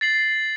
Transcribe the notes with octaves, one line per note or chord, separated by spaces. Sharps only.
A6 C7 F#7